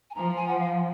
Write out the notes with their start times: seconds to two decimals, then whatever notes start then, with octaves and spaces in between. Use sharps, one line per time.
0.10 G#5
0.15 F3 A#5
0.36 G#5
0.48 F#5
0.60 F5